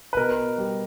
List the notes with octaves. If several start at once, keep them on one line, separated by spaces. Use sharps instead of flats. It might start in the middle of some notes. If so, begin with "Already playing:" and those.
B4
B2 A#4
G3